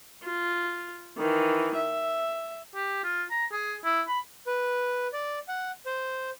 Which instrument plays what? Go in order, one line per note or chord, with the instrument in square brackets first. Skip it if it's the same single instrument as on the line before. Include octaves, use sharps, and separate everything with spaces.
[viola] F4
D#3 E3
E5
[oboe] G4
F4
A#5
G#4
E4
B5
[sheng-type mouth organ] B4
D5
F#5
C5